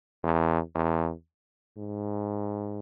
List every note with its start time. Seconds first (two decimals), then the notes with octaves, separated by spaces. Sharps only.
0.23 E2
0.75 E2
1.77 G#2